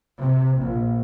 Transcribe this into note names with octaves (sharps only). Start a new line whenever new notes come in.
C3
A#1